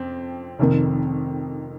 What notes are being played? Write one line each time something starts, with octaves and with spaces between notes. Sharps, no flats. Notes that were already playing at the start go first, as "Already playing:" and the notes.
Already playing: F2 C4
F1 F2 D#3